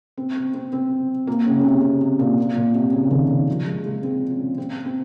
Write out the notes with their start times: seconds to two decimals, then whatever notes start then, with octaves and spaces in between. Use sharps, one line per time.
0.17 C4
0.36 C4
0.54 C4
0.73 C4
1.27 A#3
1.46 C#3
1.59 C#3
1.65 C3
1.83 C3
2.01 C3
2.19 A#2
2.38 A#2
2.56 A#2
2.74 C3
2.93 C#3
3.11 D#3
3.30 D#3
3.48 F3
3.66 G#3
3.85 G#3
4.03 C4
4.31 C#4
4.58 C4
4.85 C4